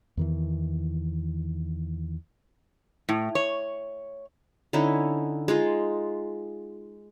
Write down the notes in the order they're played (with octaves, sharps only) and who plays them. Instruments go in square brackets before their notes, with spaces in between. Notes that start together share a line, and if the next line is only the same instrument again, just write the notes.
[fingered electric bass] E2 D#3 E3
[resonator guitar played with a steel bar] A2
C#5
[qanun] D3 C#4 D#4 E4
G#3 D#4 F4